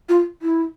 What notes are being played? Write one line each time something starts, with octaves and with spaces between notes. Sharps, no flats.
F4
E4